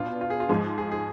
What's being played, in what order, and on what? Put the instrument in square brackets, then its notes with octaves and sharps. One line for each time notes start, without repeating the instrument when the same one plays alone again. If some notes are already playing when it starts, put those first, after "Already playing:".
Already playing: [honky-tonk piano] B2 B3 D4 [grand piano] F4
[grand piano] F4
G#4
F4
[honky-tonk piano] G#2 F3 G#3 [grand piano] G#4
[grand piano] G#4
G#4